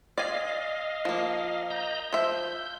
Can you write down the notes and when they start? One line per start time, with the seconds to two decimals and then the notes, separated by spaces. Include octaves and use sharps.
0.18 D5 D#5 F5 G#5
1.05 F3 A#3
1.70 D#5 A#5 G6
2.13 F3 E5 G6